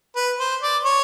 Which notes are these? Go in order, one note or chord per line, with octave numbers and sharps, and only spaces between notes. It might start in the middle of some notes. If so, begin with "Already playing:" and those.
B4
C5
D5
C#5